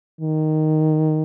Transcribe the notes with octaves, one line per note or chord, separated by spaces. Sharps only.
D#3